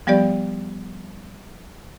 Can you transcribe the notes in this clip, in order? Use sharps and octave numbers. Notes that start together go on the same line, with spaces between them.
F3 G3 B3 G4 D5